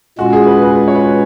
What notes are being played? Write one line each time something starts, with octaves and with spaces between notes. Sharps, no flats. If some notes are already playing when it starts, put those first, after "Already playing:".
A#2 G#3 C#4 F4 F#4
G#4
B4
B4
B4
C#5
B4